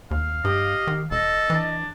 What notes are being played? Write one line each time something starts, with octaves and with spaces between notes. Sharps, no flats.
D#2 F5
G2 G4 D#5
D#3
E1 A4 D#5
E3 D4